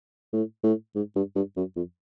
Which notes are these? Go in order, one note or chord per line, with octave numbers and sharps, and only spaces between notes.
A2
A2
G#2
G2
G2
F#2
F2